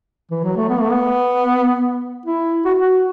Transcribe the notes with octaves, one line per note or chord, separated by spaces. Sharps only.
E3
F#3
A3
B3
A3
B3
E4
F#4
F#4